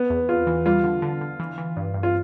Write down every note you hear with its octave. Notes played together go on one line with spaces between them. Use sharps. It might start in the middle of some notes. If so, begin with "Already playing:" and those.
Already playing: B3
E2
E2 F4
E3
G3 F4
D3
D3
D3
E3
E3
G2
G2
F4